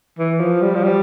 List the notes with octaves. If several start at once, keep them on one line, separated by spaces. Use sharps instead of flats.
E3
F3
G3
F3
G3